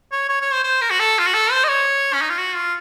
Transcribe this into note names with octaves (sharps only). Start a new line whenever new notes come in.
C#5
C#5
C#5
C5
C5
A#4
F#4
A4
F4
F#4
A4
C5
D#5
C#5
C#4
D#4
F4
F#4
F4